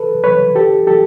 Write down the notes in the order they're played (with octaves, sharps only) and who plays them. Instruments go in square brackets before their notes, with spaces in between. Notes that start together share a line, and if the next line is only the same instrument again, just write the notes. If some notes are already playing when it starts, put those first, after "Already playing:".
Already playing: [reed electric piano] A4 B4
B4 C#5
G4 A4
G4 A4